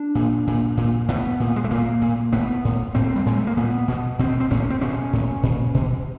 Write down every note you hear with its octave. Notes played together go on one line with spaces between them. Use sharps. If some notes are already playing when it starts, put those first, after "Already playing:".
Already playing: D4
A#2
A#2
A#2
A2 B3
A#2
G#3
A3
A#2 A#3
A#2
A2 B3
A2
A2 C4
G3
A2 G#3
A3
A#3
A#2 B3
B2
B2 C4
C4
A2 C#4
C4
B2 C#4
A2
A#2
B2